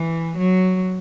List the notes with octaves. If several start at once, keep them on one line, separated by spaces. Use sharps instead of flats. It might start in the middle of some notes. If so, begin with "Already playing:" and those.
Already playing: E3
F#3